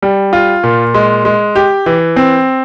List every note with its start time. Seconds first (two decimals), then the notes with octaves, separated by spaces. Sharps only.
0.02 G3
0.33 F4
0.64 A#2
0.94 G#3
1.25 G#3
1.56 G4
1.86 E3
2.16 C4